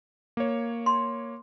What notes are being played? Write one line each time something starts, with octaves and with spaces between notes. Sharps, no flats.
A#3 C#5
C6